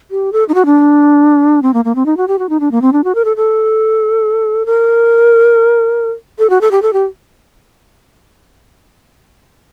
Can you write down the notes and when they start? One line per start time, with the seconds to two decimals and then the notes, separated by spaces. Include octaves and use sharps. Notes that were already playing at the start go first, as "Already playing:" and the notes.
0.11 G4
0.33 A4
0.49 D#4
0.54 F#4
0.66 D4
1.62 C4
1.74 A#3
1.85 A#3
1.95 C4
2.06 D#4
2.17 F#4
2.28 G4
2.39 F#4
2.49 D#4
2.60 D4
2.71 A#3
2.82 C4
2.93 D4
3.04 F#4
3.15 A#4
3.25 A4
3.37 A4
4.66 A#4
6.39 A4
6.50 F#4
6.61 A4
6.71 G4
6.82 A4
6.93 G4